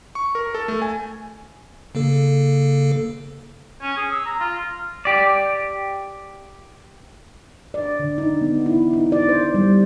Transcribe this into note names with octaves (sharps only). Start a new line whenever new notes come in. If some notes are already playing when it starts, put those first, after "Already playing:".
C#6
A#4
A4
A3
G#5
C#3 A#3 A4
C#4
G#4
E6
A#5
F4
G4 D5
D5
D3
D#4
B3
E4
D#4
D5
C5
G3